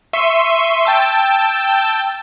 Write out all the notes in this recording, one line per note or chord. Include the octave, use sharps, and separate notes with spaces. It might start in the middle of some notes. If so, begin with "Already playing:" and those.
E5 C6 C#6 D#7
G5 A5 E6